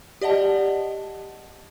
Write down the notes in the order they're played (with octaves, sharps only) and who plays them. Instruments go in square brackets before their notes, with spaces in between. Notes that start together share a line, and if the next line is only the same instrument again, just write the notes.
[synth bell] G4 D5 D#5 F#5 A5